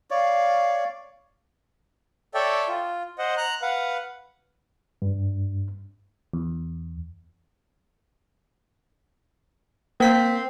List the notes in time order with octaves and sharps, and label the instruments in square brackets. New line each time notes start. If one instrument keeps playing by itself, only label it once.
[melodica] C#5 D5 [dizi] F5
[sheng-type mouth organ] A4 C#5 D5 E5 G5
F4
C5 D#5 F#5
A#5 F#6
B4 F5 F#5
[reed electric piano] G2
[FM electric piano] E2
[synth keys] A#3 B6 [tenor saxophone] C4